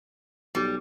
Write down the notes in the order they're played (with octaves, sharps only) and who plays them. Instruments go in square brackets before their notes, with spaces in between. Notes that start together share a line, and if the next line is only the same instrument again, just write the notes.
[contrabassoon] B1 [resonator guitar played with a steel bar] G3